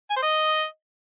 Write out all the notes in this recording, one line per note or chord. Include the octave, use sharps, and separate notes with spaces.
G#5
C5
D#5